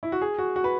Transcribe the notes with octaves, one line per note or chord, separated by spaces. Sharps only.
E4
F#4
G#4
F#4
F#4
B4